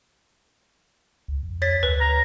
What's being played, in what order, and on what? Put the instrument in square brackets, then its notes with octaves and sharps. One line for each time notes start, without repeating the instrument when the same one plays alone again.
[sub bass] C#2
F2
[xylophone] C#5 A6 B6
[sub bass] D2 [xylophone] B4
[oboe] A#5